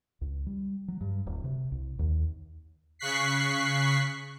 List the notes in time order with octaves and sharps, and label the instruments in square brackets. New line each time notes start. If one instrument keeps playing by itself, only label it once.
[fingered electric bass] C#2
G3
F#3
G2
D1
C3
C2
D#2
[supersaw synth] C#3 C#6 F#6 B6 C7